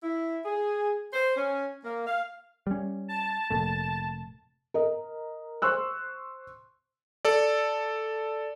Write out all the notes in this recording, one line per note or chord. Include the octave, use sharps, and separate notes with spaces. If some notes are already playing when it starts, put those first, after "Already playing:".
E4
G#4
C5
C#4
A#3
F5
G3 C#4
A5
F1 A#2 A3
A#4 D#5
C5 C6 C#6 E6 F#6
A4 D5